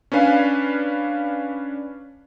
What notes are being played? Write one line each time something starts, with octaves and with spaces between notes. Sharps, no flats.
C#4 D4 B4 F5 G#5